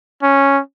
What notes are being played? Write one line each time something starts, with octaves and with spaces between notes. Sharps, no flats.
C#4